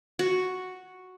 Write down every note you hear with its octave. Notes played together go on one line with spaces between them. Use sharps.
F#4